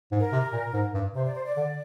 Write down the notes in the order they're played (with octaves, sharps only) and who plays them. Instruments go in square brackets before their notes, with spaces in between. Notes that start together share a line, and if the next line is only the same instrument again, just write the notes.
[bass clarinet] G#2
[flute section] A#4
[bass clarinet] C3
A#2
G#2
G2
[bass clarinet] C3 [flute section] C5
[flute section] D5
C5
D5
[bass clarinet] D3 [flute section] D5